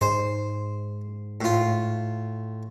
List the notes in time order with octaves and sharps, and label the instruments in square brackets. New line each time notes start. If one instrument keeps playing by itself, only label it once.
[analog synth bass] G#2 [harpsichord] C5
[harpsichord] A2 F4